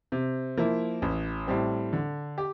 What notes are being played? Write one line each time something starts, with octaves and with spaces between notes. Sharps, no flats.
C3
F3 A#3 E4
A1
A2 G3 C4
D3
G4